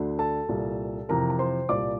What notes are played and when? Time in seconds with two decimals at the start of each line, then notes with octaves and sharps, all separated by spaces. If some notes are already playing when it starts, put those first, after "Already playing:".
Already playing: D2 D3
0.19 A4 A5
0.49 C2 A#2
1.09 F2 C3 E3 A#4 A#5
1.30 A#5
1.39 C5 C6
1.69 C2 A#2 D5 D6